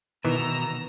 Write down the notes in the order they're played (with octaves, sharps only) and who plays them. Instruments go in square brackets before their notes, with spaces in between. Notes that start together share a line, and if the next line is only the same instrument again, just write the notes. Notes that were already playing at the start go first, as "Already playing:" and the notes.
[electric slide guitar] B2 [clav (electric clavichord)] D#3 E3 E4 [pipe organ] A#5 E6